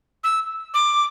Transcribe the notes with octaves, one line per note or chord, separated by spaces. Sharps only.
E6
D6